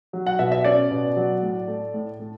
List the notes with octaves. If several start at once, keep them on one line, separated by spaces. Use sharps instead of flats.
F#3
F#5
B2 E5
E5
C#4 D5
B2
F#3
A2
A3
A2
A3